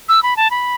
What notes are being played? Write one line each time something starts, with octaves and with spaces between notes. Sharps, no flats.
E6
B5
A5
B5